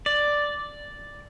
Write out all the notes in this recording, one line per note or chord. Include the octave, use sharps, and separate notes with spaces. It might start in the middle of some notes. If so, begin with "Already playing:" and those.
D5